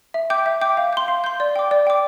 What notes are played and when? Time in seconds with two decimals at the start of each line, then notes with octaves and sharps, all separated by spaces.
0.14 E5
0.30 G5 D6 G6
0.46 E5
0.61 G5 D6 G6
0.77 F5
0.93 C6 G6
1.08 F5
1.24 C6 G6
1.40 D5
1.56 G5 D6
1.71 D5
1.87 G5 D6